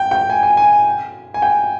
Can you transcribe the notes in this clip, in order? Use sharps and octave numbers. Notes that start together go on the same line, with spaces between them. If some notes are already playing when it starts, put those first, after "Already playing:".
Already playing: G5
G5
G#5
G#5
G#5
G#5
G5